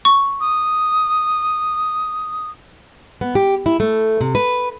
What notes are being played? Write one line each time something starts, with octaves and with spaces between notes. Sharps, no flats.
C#6
D#6
B3
G4
E4
A3
C3
B4